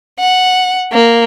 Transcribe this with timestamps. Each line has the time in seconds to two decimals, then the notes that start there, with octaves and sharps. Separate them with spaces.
0.19 F#5
0.93 A#3